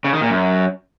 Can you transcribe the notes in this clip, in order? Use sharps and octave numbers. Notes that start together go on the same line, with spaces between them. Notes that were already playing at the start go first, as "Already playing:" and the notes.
C#3
D#3
A#2
F#2